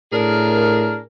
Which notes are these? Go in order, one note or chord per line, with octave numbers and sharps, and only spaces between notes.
A2 D4 G#4 A#4